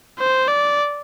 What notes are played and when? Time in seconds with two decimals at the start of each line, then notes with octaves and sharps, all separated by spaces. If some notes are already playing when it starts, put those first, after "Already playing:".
0.19 C5
0.48 D5